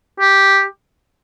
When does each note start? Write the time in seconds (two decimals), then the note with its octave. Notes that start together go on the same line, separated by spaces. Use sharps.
0.20 G4